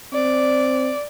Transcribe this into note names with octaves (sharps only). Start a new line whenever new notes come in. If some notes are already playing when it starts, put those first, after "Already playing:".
C4 D5